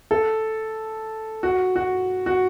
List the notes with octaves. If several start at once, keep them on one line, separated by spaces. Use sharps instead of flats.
A4
F#4
F#4
F#4